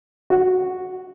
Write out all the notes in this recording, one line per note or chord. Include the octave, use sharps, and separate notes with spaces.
F#4